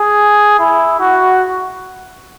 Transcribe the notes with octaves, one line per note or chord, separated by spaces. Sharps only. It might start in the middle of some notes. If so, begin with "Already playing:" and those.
Already playing: G#4
E4
F#4